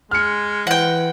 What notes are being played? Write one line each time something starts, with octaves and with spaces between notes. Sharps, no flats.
G#3 F6 C#7
E3 F#5 G5